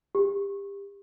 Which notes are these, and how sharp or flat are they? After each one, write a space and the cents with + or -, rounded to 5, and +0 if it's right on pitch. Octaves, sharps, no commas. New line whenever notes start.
G4 +25